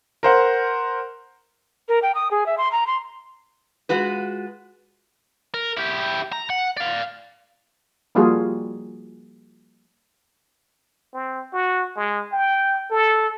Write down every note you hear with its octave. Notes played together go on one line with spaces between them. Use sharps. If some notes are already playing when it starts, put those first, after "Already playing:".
A#4 C5 F#5
A#4
G5
D#6
G#4
E5
C6
A#5
C6
G#3 F4 F#4 B4
A#4
E4 G4
A#5
F#5
D5 F5
F3 G3 A#3 F4 F#4 G#4
C4
F#4
G#3
G5
A4